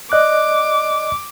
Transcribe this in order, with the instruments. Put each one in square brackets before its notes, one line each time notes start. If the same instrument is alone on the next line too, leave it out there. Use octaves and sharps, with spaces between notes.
[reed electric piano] D5 D#5 F#6 [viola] D6